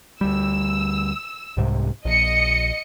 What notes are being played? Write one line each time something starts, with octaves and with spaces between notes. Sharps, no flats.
D2 G3 E6
C2 G#2 C3
A#1 D#5 C#7